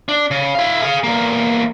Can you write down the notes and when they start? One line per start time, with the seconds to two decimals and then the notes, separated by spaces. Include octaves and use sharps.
0.09 D4
0.31 C#3
0.55 E4 F5
0.82 G#4 F5
1.04 E2 A#3